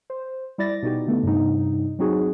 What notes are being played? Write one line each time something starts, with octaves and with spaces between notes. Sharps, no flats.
C5
G3 E4 D5 A6 A#6
B2 D#4 F#4 G4
D3 A3 B3
G2 C3 G3 D#4
F#3 C4 D#4 F#4 G#4